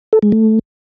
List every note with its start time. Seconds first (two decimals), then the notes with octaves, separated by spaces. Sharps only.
0.13 A4
0.22 G#3
0.32 A3